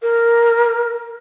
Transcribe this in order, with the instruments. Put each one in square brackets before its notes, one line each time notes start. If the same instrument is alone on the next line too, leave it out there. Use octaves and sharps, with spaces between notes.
[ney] A#4